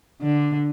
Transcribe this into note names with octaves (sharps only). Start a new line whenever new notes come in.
D3